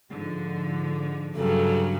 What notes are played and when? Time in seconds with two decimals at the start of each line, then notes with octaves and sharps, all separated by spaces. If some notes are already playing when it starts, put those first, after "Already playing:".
0.11 G#2 D3 F3
1.36 G2 C#3 F#3 A4